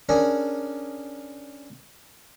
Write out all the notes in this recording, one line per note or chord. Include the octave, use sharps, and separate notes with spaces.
C#4 D4 G#4 A#4 D5